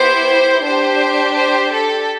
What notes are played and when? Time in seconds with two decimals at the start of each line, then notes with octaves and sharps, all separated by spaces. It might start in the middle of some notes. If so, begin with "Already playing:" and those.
Already playing: B3 E4 G4 C5
0.64 D4 G4 C5
1.36 C5
1.72 A4